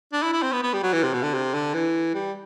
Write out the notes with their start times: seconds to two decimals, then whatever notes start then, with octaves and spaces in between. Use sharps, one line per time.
0.13 D4
0.23 E4
0.33 E4
0.43 C4
0.53 B3
0.63 B3
0.73 G3
0.83 F#3
0.93 E3
1.03 C3
1.14 B2
1.23 D3
1.34 C3
1.54 D3
1.74 E3
2.14 G3